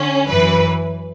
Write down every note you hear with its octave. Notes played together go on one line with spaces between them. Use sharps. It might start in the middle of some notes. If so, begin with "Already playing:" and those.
Already playing: D3 C#4
F#2 E3 B4